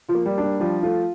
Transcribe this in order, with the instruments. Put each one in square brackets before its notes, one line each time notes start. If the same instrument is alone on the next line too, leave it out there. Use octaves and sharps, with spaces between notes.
[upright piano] F3 F4
[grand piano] A#3
[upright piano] G3
[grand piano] D4
[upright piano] G3
[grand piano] F3 [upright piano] G3
[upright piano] A3 [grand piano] F4